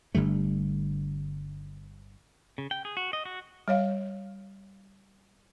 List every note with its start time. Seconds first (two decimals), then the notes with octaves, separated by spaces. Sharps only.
0.15 G1 D3 G3 A3
2.58 C#3
2.71 G5
2.85 G#4
2.97 F#4
3.13 D#5
3.25 F#4
3.68 G3 C#5 F5